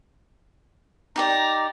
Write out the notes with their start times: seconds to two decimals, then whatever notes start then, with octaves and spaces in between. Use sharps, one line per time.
1.16 D#4 G4 D5 A#5